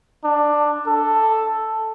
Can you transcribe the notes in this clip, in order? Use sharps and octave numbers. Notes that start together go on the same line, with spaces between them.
D4
A4